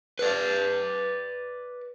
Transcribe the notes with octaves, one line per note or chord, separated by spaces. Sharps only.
B4 D5